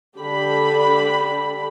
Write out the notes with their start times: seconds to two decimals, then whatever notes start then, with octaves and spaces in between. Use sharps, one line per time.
0.17 D3 D4 G4 B5